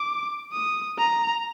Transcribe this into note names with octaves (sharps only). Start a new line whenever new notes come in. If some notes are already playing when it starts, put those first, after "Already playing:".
Already playing: D6
D#6
A#5